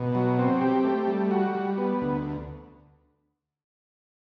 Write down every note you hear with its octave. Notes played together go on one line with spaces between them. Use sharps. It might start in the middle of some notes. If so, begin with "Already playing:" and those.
Already playing: B2
F#3
C4
G4
A3
G3
F#4
G3
B3
D2